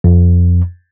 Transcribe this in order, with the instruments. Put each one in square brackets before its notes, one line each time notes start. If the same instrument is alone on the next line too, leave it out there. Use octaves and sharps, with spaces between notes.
[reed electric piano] F2